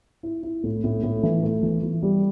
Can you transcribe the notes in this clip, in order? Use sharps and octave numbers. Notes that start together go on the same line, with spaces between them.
E4
E4
A2
A2
A2
E3
A3
E3
E3
G3